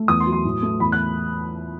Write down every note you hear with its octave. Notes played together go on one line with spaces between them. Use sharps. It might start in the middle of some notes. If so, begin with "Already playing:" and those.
Already playing: A3
E2 D#6
C6
F#3
C6
A2
A3
E2 B5
F#6